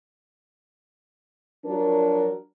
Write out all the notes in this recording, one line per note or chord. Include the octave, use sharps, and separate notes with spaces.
F3 F#3 D4 A#4